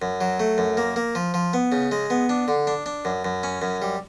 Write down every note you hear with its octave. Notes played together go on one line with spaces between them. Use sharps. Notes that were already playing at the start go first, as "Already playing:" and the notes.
F#2
F#3
A3
F#2
A#3
A#3
F3
F3
B3
C#3
G#3
B3
D4
D3
D4
D4
F#2
F#2
C#4
F#2
G3